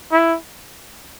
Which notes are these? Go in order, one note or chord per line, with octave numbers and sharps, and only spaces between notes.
E4